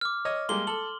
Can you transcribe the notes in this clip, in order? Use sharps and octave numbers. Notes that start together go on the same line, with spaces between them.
D6 F6
C#5 D#5
G3 G#3 A#3 C6 G7
A4 F#7